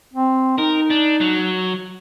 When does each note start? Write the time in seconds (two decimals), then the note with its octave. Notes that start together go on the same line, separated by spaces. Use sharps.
0.14 C4
0.58 D#4 A#4
0.90 D4
1.21 F#3